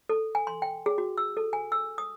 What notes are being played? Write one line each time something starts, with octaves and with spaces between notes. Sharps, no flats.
A4
G#5
C6
G5
G#4
F#4
E6
A4
G#5
E6
D#6